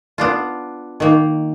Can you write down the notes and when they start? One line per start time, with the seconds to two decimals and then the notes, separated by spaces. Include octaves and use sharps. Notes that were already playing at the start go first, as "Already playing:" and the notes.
0.18 B3 D4 F4
1.00 D#3 A#3